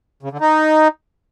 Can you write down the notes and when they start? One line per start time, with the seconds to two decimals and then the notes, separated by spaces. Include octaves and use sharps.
0.23 C#3
0.32 D3
0.41 D#4